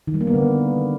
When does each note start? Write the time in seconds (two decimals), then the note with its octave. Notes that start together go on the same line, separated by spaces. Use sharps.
0.07 D#3
0.14 G3
0.21 A#3
0.27 B3
0.34 D3